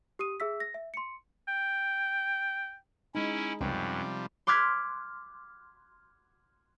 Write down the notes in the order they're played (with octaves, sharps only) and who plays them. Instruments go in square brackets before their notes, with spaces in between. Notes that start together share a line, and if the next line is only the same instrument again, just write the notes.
[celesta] G4 D#6 D#7
G#4 E5 E6 B6
A#6
E5
C6 C#7
[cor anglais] G5
[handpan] G#3 D#4 [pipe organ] C#4 E4
[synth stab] C#2 [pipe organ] F#2 [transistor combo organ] C3 F3 G3
[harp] C6 D6 F6 F#6 G#6 B6